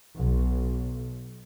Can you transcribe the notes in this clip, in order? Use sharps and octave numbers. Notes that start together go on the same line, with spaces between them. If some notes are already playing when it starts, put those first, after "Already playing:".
B1